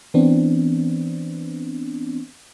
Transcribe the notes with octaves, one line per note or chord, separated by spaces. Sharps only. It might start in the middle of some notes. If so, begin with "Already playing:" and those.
E3 B3 C4 D4